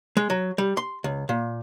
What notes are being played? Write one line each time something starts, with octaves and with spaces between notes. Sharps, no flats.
G#3
F#3
G3
C6
C#2
A#2